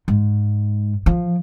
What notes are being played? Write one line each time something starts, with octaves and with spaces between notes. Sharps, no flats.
G#2
F3